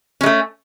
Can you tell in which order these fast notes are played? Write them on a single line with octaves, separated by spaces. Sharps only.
C#4 G#3 A3